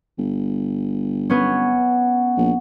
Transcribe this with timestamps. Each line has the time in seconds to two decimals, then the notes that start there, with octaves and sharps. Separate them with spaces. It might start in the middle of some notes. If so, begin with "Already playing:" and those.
0.18 G1
1.30 B3 C#4
2.37 A#1